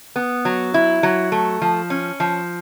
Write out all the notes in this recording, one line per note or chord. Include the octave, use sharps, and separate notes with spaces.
B3
F#3
E4
F#3
A3
F3
C#4
F3